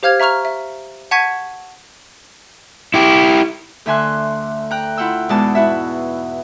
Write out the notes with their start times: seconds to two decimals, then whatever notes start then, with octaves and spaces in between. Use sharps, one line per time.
0.03 G4 C5 F5 F6 G#6 F7
0.20 E5 A#5 C#6 F6 F7
0.45 E5
1.11 F#5 A5 C#6 G#6 B6 D#7
2.94 E4 G4
3.86 D2 D3 E5 G#5 C6 F#6
4.71 G5 A#5 F#6
4.97 E4 F4 F#5 G5 E6
5.29 E2 G#2 B2 G#3 D5 A5
5.55 E4 F#4 E5